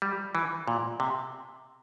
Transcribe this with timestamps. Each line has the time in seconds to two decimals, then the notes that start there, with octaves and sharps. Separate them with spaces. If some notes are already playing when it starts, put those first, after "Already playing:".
0.02 G3
0.35 E3
0.68 A#2
1.00 C3